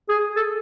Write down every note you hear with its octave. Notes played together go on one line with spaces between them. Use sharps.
G#4
A4